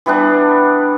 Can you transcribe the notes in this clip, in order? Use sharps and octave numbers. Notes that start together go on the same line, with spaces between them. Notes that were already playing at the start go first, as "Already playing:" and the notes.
E3 G3 B3 D4